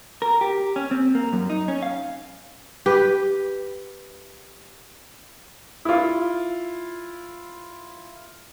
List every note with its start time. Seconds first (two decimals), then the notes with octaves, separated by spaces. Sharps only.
0.22 A#4
0.41 G4
0.76 C#4
0.91 C4
1.15 A#3
1.33 F#2
1.50 D#4
1.68 C#4
1.83 F5
2.86 G4 B4
5.85 E4 F4